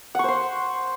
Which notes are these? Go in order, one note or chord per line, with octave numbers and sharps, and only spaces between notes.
C5 F#5 C6 C#6